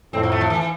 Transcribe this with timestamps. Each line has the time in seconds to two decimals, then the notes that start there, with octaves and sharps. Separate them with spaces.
0.13 F2 A2 C4
0.23 A#3
0.32 A3
0.41 F3
0.50 E3